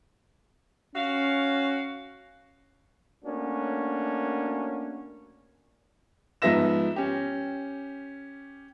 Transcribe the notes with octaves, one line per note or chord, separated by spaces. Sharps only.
C#4 F#4 F5
A3 A#3 C#4 D4 F#4
G#2 F3 B3 E5 A#6 E7
C#4 G4